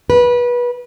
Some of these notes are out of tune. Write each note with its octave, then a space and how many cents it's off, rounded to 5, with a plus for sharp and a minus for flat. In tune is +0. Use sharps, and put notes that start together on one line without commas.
B4 -25